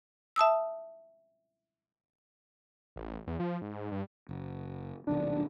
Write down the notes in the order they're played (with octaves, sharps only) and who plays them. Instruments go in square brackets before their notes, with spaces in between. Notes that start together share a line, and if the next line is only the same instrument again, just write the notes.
[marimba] E5 A5 D#6 E6
[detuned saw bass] A1
E2
F3
G#2
G2
[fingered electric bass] F#1
[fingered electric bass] D#1 B1 D#3 [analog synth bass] D4